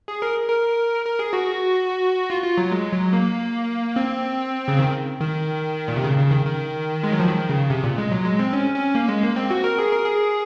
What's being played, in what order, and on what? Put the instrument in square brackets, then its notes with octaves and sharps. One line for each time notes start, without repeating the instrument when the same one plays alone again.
[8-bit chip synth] G#4
A#4
A#4
A#4
G#4
F#4
F4
F4
F#3
G#3
F#3
A#3
C4
C#3
D#3
D#3
A#2
C3
C#3
C#3
D#3
D#3
G#3
F#3
F3
D#3
C#3
C3
A#2
G#3
F#3
G#3
C4
C#4
C#4
A#3
G#3
A#3
C4
F#4
A#4
G#4
A#4
G#4